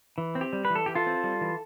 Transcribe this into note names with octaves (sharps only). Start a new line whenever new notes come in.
E3
C4
G4
G3
B4
E3
A4
E3 G4
F4 A4
C4
G3
E3